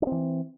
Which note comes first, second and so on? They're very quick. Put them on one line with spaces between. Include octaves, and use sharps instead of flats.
D4 C4 E3